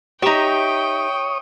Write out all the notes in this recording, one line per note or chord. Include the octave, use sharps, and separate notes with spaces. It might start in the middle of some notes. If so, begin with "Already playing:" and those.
D#4 G4 C#5 E5 G5 A#5 D#6